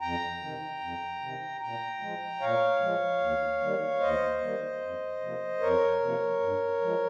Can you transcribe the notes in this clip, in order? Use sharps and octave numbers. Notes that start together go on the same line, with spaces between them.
F2 G5 A#5
C3 D#3
F2
C3 D#3
A#2 G5 A#5
F3 G#3
A#2 C#5 F5
F3 G#3
D#2
D#3 G3 A#3
D#2 C5 D#5
D#3 G3 A#3
F2
C3 F3 A#3
F2 A#4 C#5
C3 F3 A#3
G2
F3 G#3